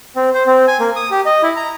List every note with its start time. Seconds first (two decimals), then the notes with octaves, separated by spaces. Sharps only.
0.16 C4
0.34 C5
0.47 C4
0.68 G#5
0.80 A#3
0.96 D#6
1.11 G4
1.25 D#5
1.43 E4
1.57 A#5